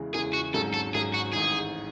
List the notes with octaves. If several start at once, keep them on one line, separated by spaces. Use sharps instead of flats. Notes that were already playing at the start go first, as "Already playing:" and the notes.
Already playing: E2 C#3 E3 G#3
E2 C#3 E3 G#3 G#4
F#4
G#1 G#2 F#3 C#4 A4
A4
G#1 G#2 F#3 C#4 G#4
F#4
A1 G#2 D#3 G#4